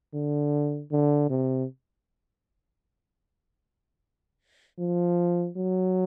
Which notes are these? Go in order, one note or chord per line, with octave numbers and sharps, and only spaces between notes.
D3
D3
C3
F3
F#3